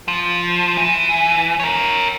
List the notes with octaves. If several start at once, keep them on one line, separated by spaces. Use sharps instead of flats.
F3
E3
A#4 C#5